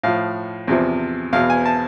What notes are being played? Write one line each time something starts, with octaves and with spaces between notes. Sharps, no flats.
A2 F3 F5
E2 C3 F3
E2 B2 F5
G#5
A5